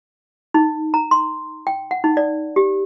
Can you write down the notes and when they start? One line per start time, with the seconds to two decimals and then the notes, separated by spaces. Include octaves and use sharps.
0.54 D#4
0.94 A#5
1.11 C6
1.67 G5
1.91 F#5
2.04 D#4
2.17 D5
2.56 G4